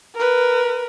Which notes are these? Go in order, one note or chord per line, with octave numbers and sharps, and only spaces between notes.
A#4 B4